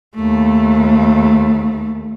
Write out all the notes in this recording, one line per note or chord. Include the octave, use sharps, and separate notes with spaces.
D#2 A3